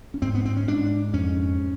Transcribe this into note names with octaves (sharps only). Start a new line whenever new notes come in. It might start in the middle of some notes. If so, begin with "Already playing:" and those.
C#4
G#2 C4
B3
C4
C#4
G#2 D4
F2 C#4